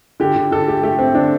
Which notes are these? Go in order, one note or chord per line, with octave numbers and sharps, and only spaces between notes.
D3 G4
D3
D3 A4
A3 G4
A3 G4
A3 C4
D3 D4